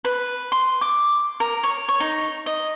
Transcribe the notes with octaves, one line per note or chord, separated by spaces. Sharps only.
B4
C6
D6
A#4
C#5
C#5
D#4
D#5